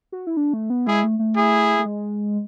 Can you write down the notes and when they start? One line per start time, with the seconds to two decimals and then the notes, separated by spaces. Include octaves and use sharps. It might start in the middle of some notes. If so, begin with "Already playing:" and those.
0.12 F#4
0.27 E4
0.37 D4
0.53 A3
0.70 B3
0.86 G#3 E4 G#4
1.04 A3
1.19 A3
1.36 E4 G#4
1.79 A3
1.85 G#3